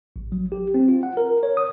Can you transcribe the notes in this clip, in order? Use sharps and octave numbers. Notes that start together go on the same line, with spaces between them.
A1
F#3
G4
C4
F4
F#5
A#4
C#5
D#6